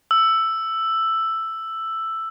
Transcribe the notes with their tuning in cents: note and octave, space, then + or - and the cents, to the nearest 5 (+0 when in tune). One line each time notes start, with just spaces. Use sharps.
E6 +5